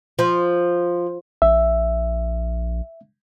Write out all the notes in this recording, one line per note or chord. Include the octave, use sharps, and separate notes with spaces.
F3
A#1 E5